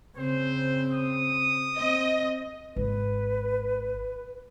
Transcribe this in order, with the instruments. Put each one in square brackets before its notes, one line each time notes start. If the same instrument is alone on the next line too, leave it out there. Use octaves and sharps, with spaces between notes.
[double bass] C#3 C4 [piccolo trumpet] C5
[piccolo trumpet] D#6
[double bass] C4 [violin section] D#5
[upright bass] G#1 [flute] B4